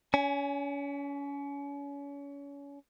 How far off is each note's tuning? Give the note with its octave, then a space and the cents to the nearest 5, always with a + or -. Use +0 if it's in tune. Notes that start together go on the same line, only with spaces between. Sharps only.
C#4 +35 G#5 +0